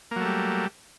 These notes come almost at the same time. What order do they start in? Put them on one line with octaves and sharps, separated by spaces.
A#3 F#3 A3 G3